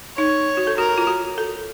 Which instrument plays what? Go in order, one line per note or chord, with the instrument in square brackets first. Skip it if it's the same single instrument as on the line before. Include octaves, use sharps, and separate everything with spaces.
[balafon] D#4 [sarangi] C#5
[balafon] F#4
A4
[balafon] F#4 [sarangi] A#4
[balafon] F4
F#4
A4